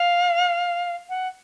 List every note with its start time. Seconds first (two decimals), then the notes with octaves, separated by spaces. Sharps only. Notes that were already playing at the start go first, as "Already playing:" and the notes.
Already playing: F5
1.09 F#5